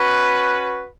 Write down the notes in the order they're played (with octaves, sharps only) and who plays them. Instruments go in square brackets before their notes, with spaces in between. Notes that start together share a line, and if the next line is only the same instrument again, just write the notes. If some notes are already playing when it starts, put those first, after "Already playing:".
Already playing: [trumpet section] C#4 F#4 B4